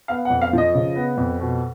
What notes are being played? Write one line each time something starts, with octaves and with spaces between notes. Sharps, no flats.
B3 F5
F#5
F2
F5
F3 D#5
C#3
B3
F2
B2